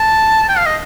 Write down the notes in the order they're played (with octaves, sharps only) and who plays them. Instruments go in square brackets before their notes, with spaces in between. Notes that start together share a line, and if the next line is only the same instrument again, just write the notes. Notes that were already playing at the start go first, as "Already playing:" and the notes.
Already playing: [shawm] A5
G5
F5
D#5